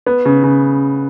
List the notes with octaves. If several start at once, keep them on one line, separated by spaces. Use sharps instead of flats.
B3
C#3
C#3